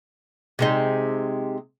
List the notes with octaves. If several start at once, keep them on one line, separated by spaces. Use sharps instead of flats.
C3 G#3 D#4